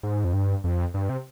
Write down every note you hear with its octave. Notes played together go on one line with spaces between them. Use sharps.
G#2
F2
G2
F2
G2
C3